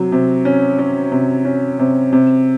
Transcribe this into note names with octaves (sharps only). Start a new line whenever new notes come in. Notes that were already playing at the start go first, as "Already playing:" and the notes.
Already playing: C3 F#3
C3
C#4
C#4
C3
C#4
C3
C3